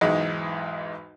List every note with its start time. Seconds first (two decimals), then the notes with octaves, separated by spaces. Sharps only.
0.01 B1 E2 G#2 G#3